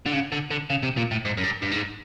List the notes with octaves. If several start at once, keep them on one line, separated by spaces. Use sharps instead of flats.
D3
C#3
D3
D3
C#3
C3
A#2
A2
G#2
F#2
G2
G2
G#2